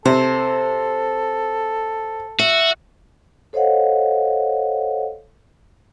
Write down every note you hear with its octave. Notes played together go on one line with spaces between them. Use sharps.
C3 A4 C5
F#4 E5
A4 C5 C#5 D#5 F5 F#5